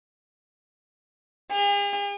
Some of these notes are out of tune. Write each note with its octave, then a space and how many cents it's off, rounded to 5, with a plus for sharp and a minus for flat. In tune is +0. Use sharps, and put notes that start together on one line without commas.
G#4 -45